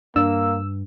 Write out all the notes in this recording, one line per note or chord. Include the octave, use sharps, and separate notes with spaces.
G2 A#3 D4 E6